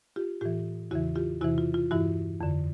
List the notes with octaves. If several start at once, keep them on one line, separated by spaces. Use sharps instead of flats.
F4 G4
A2 E3 F4 G4
E2 C#3 E3 E4 F#4
F4 G4
E2 C3 E3 E4 F#4
F4
F4
G2 E3 E4 F#4
F2 D3